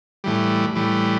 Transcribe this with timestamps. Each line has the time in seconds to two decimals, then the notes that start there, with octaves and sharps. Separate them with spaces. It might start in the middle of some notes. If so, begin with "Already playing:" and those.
0.24 A2 E3 G3
0.75 A2 E3 G3